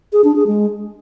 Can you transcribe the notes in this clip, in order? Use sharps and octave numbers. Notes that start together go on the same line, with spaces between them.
G#4
D4
G#4
G#3